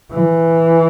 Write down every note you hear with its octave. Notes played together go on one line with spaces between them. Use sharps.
E3